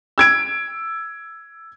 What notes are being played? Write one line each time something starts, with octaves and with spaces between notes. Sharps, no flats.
E6 G#6 D7